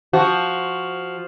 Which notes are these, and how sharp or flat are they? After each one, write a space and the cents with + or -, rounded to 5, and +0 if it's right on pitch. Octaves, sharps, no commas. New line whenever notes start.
F3 +0 F#4 +5